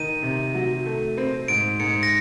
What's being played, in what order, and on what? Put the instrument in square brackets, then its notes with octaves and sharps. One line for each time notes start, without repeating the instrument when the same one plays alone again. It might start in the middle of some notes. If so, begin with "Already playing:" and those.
Already playing: [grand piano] D#3 [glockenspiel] D#7
[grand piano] C3
F#3
A3
C4
[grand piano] G#2 [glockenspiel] D7
[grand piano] G#2 [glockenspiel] C#7
[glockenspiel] A#6